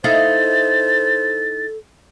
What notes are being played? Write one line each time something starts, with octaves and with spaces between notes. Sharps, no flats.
D#4 E4 A4 C5 F5 A6